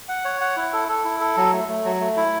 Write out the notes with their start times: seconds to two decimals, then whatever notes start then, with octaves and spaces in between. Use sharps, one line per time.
0.09 F#5
0.25 C#5
0.41 F#5
0.56 E4
0.73 A4
0.88 A4
1.05 E4
1.20 A4
1.37 F#3
1.53 A3
1.68 A3
1.85 F#3
2.00 A3
2.17 E4